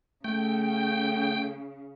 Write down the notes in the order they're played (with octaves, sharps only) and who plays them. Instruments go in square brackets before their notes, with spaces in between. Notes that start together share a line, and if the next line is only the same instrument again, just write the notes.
[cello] C#3 [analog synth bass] A3 [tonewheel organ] G5